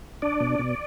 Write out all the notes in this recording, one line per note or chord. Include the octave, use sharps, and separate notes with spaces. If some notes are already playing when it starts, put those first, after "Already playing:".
D4 D5
B2
B2